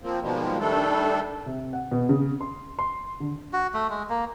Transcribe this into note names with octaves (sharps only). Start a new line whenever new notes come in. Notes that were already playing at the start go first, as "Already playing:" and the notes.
F3 A#3 C4
B2 D#3 F3 G3 G#3 A#3
D#3 G3 A3 D4 A4
C3
F#5
B2
C#3
C6
C6
D3
F#4
A3
G#3
A#3